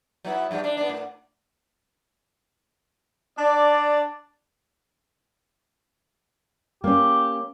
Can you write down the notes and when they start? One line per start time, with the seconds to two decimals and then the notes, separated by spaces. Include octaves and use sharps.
0.25 F#3 B3 E4
0.51 G2 F3 G3
0.64 D4
0.77 B3 D4
0.89 A2
3.38 D4 D5
6.84 A#3 C#4 G4